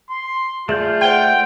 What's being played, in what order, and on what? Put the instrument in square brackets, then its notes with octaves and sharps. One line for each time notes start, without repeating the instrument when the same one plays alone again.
[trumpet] C6
[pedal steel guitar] A3 D5 G6 [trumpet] F4 [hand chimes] G#4
[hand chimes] C5 F#5 C6 [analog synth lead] G5